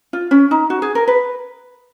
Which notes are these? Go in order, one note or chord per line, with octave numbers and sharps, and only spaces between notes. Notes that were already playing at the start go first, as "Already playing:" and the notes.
F4
C#4
D#4
F#4
G#4
A#4
B4